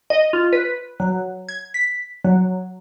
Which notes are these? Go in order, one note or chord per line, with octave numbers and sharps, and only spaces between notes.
D#5
F4
B4
F#3
G#6
B6
F#3